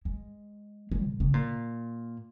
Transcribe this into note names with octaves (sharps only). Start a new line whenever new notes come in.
G#3
G#3
A#2
C#3
A#2